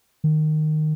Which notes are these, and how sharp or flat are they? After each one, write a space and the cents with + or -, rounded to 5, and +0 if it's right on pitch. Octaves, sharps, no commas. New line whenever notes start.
D#3 -15